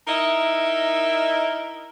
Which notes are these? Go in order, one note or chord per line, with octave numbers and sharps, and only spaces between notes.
D#4 E4 A#4 D#5 E5